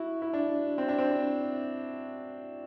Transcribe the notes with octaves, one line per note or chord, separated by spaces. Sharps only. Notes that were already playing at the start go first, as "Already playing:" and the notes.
Already playing: E4 F#4
E4
D4
C4
D4
C4